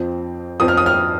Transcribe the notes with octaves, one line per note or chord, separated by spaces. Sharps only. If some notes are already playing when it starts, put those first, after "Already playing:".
Already playing: F2 F3 C4
F2 F3 C4 D#6
F6
D#6
F6